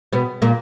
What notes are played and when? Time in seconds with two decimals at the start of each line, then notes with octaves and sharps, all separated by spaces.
0.13 B2 B3
0.42 A#2 A#3